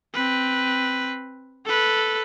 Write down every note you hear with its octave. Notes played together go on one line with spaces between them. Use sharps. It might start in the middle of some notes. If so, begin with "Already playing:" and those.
C4 B4
A4 B4